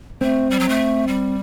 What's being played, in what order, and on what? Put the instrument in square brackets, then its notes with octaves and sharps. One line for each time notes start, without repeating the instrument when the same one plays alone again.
[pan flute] A3 [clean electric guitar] C4
[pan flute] G3
F#3
A3
G3